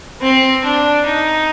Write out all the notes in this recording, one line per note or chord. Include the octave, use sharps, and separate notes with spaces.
C4
D4
D#4